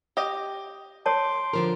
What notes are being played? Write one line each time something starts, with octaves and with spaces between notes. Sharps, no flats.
G4 D#5
C#5 A5 C6 D6
D3 F3 A#4